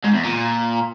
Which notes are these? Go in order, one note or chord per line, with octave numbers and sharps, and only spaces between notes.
G#2
E2
A#2